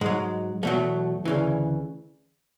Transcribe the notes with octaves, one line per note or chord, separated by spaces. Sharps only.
G#2 F#3 G#3
E2 B2 F#3 A3
D2 C#3 E3